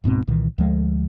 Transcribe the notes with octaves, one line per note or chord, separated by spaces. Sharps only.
D1 G#2 B2 C4
C2 A#2 D#3 E3
D2 F3 G#3